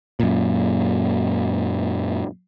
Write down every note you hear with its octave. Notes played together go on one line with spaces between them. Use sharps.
F#2 A#2